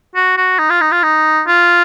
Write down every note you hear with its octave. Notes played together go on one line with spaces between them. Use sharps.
F#4
F#4
D#4
F4
D#4
F4
D#4
F4